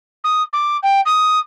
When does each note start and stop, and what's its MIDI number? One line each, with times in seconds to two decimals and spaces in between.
0.24 0.42 87
0.53 0.77 86
0.83 1.01 79
1.06 1.39 87